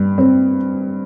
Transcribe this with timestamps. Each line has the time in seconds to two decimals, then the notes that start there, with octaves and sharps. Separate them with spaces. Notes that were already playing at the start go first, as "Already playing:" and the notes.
Already playing: G2
0.18 C4